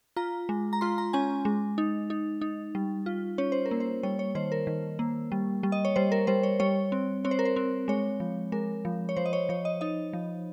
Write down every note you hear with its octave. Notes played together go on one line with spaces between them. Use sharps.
F4 A#5
G#3
A#5
F4 C6
A#5
C#4 G#5
G#3
D#4
D#4
D#4
G3
F4
C#4 C#5
C5
A#4
A#3
C5
G3 C#5
C#5
D#3 C5
A#4
D#3
A#3
G3
G3
D#5
C#5
G3 C5
A#4
G3 C5
C#5
G3 C#5
C4
C4 C#5
C5
A#4
C5
C4
G#3 C#5
F3
G#3 A#4
F3
C#5
F3 C5
D#5
C#5
F3 C#5
D#5
D#4 D#5
F3